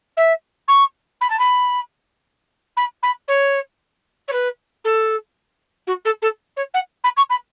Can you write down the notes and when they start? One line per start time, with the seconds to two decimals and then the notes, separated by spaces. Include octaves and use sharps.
0.17 E5
0.67 C#6
1.21 B5
1.30 A5
1.39 B5
2.76 B5
3.02 B5
3.28 C#5
4.28 C#5
4.32 B4
4.84 A4
5.87 F#4
6.04 A4
6.22 A4
6.56 C#5
6.74 F#5
7.04 B5
7.16 C#6
7.29 B5